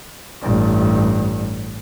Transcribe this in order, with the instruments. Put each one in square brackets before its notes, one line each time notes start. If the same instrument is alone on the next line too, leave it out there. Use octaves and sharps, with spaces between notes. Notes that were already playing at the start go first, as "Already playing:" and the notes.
[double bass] A1 G2